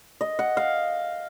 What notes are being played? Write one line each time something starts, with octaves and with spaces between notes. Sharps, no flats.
D#5
F#5
F5